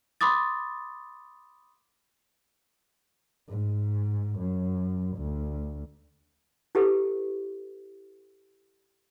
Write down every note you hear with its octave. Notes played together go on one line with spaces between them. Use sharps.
B5 C6 D6 D#6 A6
G#2
F#2
D2
E4 G4 A4 B4